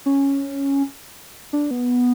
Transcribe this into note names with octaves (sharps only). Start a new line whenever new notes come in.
C#4
D4
B3